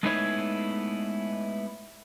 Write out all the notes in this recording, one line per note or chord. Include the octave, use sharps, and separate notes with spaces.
G#3 A3 B3 D#4 E4 C#5